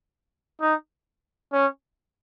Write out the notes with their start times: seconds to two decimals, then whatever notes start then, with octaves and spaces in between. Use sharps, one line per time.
0.61 D#4
1.53 C#4